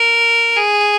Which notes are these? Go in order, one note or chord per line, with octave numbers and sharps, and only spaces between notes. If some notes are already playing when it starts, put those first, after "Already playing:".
Already playing: A#4
G#4